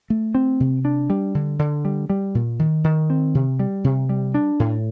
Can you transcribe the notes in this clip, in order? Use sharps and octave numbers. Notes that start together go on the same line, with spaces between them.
A3
C4
C3
D4
G3
D3
D3
G3
G3
A#2
D#3
D#3
C4
C3
G3
C3
G3
D4
A2